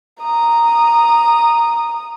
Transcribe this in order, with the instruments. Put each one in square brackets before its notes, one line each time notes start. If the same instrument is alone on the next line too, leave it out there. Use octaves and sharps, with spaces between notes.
[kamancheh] A#5 D#6